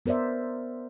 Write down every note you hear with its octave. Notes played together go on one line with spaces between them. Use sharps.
B3 A#4 C5 D5 E5